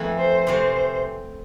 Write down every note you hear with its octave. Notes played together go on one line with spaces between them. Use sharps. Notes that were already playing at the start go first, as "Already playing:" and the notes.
Already playing: F2 E3 A3 E4
C5
C3 E3 A3 C4 C5